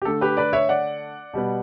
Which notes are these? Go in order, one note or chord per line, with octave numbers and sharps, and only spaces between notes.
G4
D3 A3 A4
G4 B4
B4 D5
C#5 E5
D5 F#5
B2 G3 B3